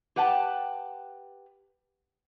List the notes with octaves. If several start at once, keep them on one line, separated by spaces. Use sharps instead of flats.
G4 B4 F#5 G5 A5